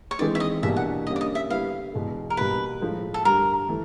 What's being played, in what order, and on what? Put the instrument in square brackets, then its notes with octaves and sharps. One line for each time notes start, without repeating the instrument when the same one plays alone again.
[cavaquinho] C#5
[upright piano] E3 G#3 C4 D#4 [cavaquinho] D5
[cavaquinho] E5
D#5
[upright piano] E2 B2 G3 A#3 D4 [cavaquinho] E5
[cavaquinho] F#5
[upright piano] D3 G3 A#3 C#4 [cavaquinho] D#5
[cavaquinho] D5
D#5
E5
[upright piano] D3 G3 B3 E4 [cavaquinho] F5
[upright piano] E2 B2 G#3
[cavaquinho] A#4
[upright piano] B2 G3 A#3 [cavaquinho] B4
[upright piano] A2 F3 G#3
[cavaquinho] A4
[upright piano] G2 D3 G3 [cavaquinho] A#4
[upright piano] E3 A3